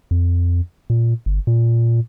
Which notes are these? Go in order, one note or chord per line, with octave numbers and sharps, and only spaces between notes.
F2
A#2
G1
A#2